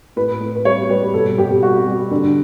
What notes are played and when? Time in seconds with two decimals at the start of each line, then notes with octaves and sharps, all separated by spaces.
0.16 A2 B4
0.40 A2
0.56 B4
0.65 G3 C#5
0.89 G3 B4
1.14 B2 A4
1.38 B2 G4
1.62 G3 F#4
1.87 G3
2.11 D3